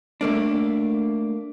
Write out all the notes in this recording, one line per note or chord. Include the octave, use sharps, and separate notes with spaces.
A3 A#3 D4